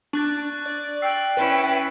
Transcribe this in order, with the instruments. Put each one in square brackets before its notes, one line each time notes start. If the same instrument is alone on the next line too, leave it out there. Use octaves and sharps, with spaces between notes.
[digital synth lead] D4 [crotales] C#6 F#6 A6
[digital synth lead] D5
[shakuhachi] G5 [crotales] E6 C7
[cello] C#4 E4 [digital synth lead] B4